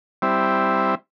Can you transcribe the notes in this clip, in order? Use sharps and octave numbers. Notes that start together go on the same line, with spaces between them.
G3 C4 E4